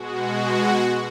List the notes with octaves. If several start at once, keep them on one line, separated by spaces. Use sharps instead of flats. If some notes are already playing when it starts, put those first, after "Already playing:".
Already playing: B2 G#3 F#4